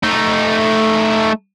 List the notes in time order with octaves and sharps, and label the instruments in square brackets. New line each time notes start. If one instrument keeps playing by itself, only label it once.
[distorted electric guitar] A3 D#4